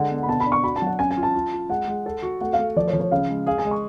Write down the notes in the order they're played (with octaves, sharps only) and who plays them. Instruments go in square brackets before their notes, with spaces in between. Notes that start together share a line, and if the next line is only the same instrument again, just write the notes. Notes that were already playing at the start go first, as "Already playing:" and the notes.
Already playing: [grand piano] D3 G#3 [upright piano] F#5
[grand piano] B3
[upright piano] B5
[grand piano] B2 [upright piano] A5
[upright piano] B5
[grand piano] D4
[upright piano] C#6
[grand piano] F#4 [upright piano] B5
[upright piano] A5
[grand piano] F#3 [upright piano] F#5
[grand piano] C#4 [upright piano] G#5
[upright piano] G#5
[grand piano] F4
[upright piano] A5
[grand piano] F4
F4
[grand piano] G#3 [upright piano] F#5
[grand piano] G#3
A4
F#4
[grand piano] A3 [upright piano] F#5
[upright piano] F5
[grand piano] A3
[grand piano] F3 [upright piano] D5
[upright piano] C#5
[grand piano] F3
[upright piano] C#5
[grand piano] C#3 [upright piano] F5
[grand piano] G#3
[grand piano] G#4 [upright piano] F5
[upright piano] G#5
[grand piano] G#3
[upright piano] C#6